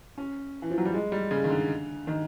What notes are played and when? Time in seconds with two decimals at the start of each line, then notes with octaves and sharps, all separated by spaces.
0.18 C#4
0.62 E3
0.71 F3
0.78 F#3
0.85 G3
0.94 G#3
1.12 G3
1.31 C#3
1.44 D#3
1.49 D3
2.07 D#3